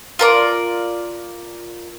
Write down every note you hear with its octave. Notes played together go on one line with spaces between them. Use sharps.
F4 A#4 D5